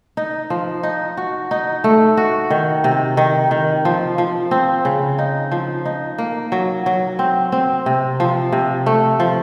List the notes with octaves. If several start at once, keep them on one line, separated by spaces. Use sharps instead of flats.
D#4
F3
D#4
F#4
D#4
A3
F#4
D#3
C3
D#3
D#3
F3
F3
C4
C#3
D#4
F3
D#4
A#3
F#3
F#3
C4
C4
C3
F3
C3
A3
F3